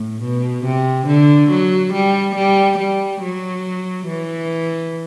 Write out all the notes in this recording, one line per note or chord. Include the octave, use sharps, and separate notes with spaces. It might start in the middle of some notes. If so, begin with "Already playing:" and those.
Already playing: A2
B2
C3
D3
F#3
G3
G3
G3
F#3
E3